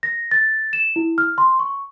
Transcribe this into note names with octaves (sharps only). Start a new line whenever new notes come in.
A#6
A6
E7
E4
F6
C6
C#6